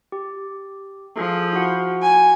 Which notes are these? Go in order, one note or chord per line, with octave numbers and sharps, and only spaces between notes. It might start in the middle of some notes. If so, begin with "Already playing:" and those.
G4
F3 G#4 A4
E4 F#4 F#5
G#5